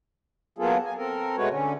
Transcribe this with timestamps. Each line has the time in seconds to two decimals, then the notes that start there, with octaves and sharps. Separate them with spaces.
0.58 F#3 A#3 B3 F4 G#4 A4
0.85 G#5
0.97 C4 A4 A#4
1.37 B2 G#3 A3 F#4 B4 C#5
1.50 D3 C#4